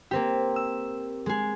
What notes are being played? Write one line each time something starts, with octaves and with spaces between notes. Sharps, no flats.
A#3 C4 G4
E6
G#3 G#4